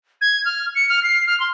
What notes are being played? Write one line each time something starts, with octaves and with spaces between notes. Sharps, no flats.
G#6
F6
C#7
F6
C7
F6
C6